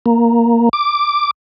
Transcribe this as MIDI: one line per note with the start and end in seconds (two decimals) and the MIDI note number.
0.06 0.69 58
0.73 1.31 86